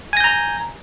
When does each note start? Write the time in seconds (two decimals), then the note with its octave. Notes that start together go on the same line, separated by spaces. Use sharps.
0.13 G#5
0.17 A#6
0.20 G6
0.24 A#5